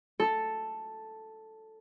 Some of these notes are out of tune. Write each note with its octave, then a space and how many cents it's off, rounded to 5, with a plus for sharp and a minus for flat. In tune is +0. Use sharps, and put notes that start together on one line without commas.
A4 +0